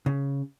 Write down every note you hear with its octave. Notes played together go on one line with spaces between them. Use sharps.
C#3